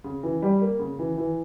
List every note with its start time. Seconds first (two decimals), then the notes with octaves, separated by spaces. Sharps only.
0.04 C#3
0.23 E3
0.42 G3
0.62 A#3
0.79 C#3
0.99 E3
1.17 E3